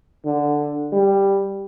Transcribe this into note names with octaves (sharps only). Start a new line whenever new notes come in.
D3
G3